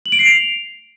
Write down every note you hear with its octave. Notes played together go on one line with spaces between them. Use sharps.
F#7
D7
C7
F7